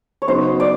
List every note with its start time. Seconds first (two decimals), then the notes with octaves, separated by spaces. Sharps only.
0.22 C#5
0.28 C#3 F#3 B3 D#4 C5
0.60 D5